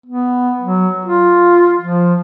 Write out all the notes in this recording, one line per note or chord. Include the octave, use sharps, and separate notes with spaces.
B3
F#3
F4
F3